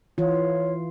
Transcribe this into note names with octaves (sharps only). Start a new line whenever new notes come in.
E3 F4 C#5